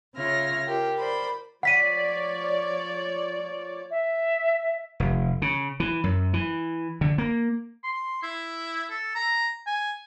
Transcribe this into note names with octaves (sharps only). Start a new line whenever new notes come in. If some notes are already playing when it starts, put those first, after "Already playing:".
C#3 F4 C#5 E5 F6 A#6
F4 G4 A#4
A#4 C5 D5 B5
F3 C#5 D5 F#5 B6 D#7
E5
F1
C#3
E3
F#2
E3
D3
A#3
C6
E4
A4
A#5
G#5